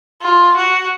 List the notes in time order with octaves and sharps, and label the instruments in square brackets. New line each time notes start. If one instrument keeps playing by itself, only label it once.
[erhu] F4
F#4